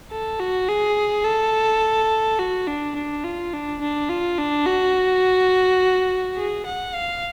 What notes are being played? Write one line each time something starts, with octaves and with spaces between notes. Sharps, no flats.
A4
F#4
G#4
A4
F#4
D4
D4
F4
D4
D4
F4
D4
F#4
G#4
F#5
F5